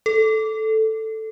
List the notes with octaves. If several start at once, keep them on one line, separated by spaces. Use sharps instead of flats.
A4